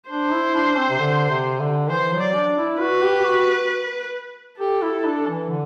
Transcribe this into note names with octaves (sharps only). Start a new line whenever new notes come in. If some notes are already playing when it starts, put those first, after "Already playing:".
D4 C5
E4
D4
C4
C3
D3
C3
D3
E3 C5
F#3
D5
D4
E4
F#4 B4
G4
F#4
G4 A4
E4
D4
E3
D3